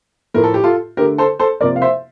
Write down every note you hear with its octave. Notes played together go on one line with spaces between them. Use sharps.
A2 F3 A3 A#4
A4
G4
F4 A4
D3 A3 G4 A#4
A4 C5
A4 C5
C3 F3 A#3 A#4 D5
F5
C5 E5